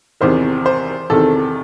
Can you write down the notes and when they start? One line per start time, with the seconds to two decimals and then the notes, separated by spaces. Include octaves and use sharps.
0.21 E2 C3 D#3 C5
0.66 C5
1.10 E2 C3 D#3 A4